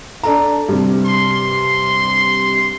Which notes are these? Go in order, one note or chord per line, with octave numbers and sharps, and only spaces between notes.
D4 A4 A#5
G2 C3
C6